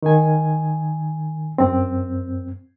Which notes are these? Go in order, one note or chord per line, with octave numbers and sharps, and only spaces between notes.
D#3 G#5
F#2 C4